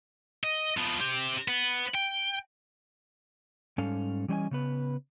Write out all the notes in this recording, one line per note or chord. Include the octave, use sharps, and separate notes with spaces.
D#5
F3 B3
C4 G4
B3
G5
G#2 G3 C#4 A4 F5
E3 G3 C#4 C5 D#5 G#5
C#3 B3 B4